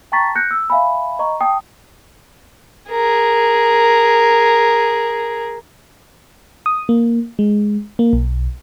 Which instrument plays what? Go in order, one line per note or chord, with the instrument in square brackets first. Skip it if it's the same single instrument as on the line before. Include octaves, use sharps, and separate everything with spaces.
[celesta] G5 A5 A#5 C#6 A6 B6
F#6 G6 A#6 C#7
E6
E5 F5 G#5 B5
D#5 A#5 C#6
G5 A5 D#6
[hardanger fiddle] G#4 A#4
[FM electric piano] D#6
A#3
G#3
A#3
B1